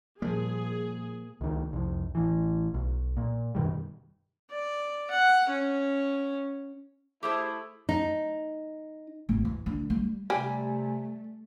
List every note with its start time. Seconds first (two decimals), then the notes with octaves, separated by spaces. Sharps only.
0.22 A#2 F3 G3 A#3 G#4
1.41 C#2 D#3
1.73 C2 F2
2.15 A1 E3
2.74 B1
3.17 A#2
3.55 F#2 B2 D#3 G3
4.51 D5
5.11 F#5
5.49 C#4
7.23 A3 E4 G4 G#4 C5
7.89 D#4
9.29 G#1
9.45 E2
9.66 D3
9.90 G3
10.30 C3 G3 A3 G#5